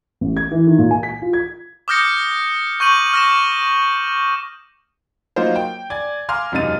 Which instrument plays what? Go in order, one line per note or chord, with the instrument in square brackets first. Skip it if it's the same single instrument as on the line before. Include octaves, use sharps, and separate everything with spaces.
[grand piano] A1
G#6
E3
D#3
A#2
G#5
B6
F4
G#6
[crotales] D6 D#6 F6 G6 A#6 C#7
C#6 G6 D#7 F#7
F6 A#6 E7
[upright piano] F#3 A#3 D#4 F4 C5
G5
D5 G#5 G#6
F5 G#5 A#5 C6 D6 F6
E1 F#2 C3 D#4 A6 D#7